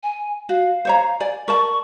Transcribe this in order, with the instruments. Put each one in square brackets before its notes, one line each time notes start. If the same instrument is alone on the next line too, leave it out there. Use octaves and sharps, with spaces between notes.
[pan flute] G#5
[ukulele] F#4 [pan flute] F5
[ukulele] C5 C#5 A#5
D5 G#5
[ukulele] A#4 D5 A5 [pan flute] C#6